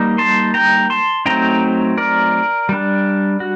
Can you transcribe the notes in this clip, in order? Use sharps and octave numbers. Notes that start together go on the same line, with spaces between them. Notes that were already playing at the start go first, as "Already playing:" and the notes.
Already playing: G3 A#3 D#4
A5 C6
G5 A#5
A5 C6
F#3 A3 C4 D#4 G5 A#5
A#4 D5
G3 D4
F#4